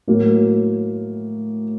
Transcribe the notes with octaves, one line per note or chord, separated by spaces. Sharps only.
A2 F#3 A#3